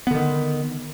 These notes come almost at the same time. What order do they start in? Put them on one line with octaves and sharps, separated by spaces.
B3 D3 D#3